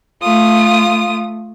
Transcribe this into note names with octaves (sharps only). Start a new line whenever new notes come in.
A3 F4 D#6